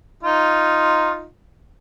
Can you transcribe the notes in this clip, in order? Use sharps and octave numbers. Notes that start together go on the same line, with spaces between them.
D#4 F4